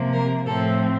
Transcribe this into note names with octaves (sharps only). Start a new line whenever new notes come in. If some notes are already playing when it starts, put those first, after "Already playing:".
Already playing: C3 F3 A#3
A#4
A2 F3 C4 A4